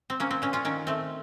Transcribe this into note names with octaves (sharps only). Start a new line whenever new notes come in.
C4
A#3 C#4
C4
A#2 C#4
C#4 F4
D#3 C#4
A3 C4